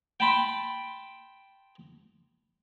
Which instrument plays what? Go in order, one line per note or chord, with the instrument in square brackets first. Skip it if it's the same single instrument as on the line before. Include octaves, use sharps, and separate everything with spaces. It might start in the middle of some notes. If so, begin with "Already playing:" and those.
[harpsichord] G5 A5 B5 C6